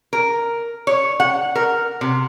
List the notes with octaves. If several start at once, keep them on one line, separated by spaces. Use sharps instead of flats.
A#4
C#5
F#5
A#4
C3